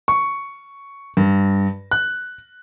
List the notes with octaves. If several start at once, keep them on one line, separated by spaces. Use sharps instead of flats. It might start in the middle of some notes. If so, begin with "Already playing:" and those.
C#6
G2
F#6